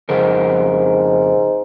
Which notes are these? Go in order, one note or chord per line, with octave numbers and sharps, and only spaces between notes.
F2 G#2 C#3 A#4